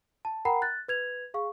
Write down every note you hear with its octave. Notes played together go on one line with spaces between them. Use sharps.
A5
A#4 F#5 G5 A#5 B5 C7
F#6 A6
B4 G#6 F7
G#4 F5 C#6